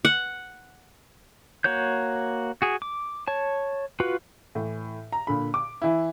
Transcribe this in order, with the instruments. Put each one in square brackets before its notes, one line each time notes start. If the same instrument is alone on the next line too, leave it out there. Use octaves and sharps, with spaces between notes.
[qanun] F#5
[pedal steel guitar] A#3 F#4 C#5 G6
F#4 G#4
D6
C#5 A5
F4 F#4 B4
[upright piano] A2 E3
A#5
A#2 D3 B5
D6
E3 E4